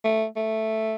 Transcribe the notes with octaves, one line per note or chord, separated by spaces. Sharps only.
A3
A3